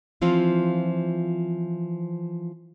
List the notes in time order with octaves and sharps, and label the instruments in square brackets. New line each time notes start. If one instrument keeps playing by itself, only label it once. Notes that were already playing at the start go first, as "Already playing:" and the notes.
[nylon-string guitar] E3 F3 C4 F4